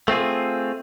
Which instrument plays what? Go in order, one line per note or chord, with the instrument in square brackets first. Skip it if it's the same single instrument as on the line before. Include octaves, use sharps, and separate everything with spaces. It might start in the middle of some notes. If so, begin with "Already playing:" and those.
[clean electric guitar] A3 C4 F4 G#4